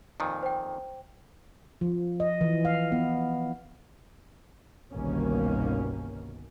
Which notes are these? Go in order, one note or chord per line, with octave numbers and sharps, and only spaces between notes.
F2 A#2 D#3
C5 G5
F3
D#5
E3
F5
B3
G1 C2 B2 D#3 A#3 C#4